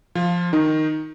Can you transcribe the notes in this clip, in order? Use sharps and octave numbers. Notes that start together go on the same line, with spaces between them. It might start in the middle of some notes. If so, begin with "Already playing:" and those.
F3 F4
D#3 D#4